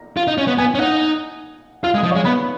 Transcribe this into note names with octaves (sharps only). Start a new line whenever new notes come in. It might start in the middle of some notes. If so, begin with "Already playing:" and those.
Already playing: A#5 A#6
F4
D#4
C#4
B3
B3 G#5 G#6
C#4
D#4 F#5 F#6
F4 F5 F6
G#3 D#5 D#6
F3
G#3 C#5 C#6
B3 B4 B5